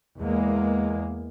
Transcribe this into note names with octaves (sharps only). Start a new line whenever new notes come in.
E2 G#3 A#3